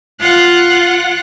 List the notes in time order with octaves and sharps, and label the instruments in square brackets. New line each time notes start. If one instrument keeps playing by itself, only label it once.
[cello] F4 F#5